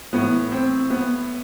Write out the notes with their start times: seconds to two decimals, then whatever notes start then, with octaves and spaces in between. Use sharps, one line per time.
0.13 A2 E3 B3
0.52 C4
0.90 B3